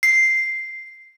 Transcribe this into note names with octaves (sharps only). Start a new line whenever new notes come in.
C7